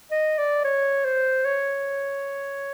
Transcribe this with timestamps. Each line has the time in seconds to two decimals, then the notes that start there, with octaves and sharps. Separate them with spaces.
0.11 D#5
0.38 D5
0.64 C#5
1.05 C5
1.45 C#5